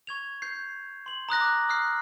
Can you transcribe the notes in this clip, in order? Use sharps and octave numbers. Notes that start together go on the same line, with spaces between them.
C#6 G#6 F7
G6 C7
C6 F#7
A#5 D#6 F#6 A#6
D6
D#6 F6 F#6 C7